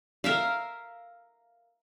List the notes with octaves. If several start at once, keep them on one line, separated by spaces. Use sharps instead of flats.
A#4 E5 F5